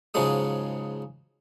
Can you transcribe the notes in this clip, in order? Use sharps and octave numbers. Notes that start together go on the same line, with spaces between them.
G#2 C#3 F3 F#3 G#3 D#6